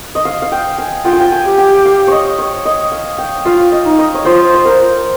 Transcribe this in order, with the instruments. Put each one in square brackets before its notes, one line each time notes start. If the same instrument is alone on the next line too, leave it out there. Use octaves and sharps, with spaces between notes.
[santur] D#5
F5
F5
G5
G#5
[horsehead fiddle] F4 [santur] G5
[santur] G#5
G5
G#5
[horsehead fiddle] G4
[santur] G5
F5
C#5 D#5
C#5
D#5
F5
G5
[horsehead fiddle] F4 [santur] F5
[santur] D#5
[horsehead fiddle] D#4
[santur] D#5
C#5
[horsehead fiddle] F4 [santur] C5
[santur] C5
A#4